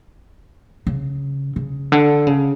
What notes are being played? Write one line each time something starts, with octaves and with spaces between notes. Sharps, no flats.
C#3
C#3
D3
C#3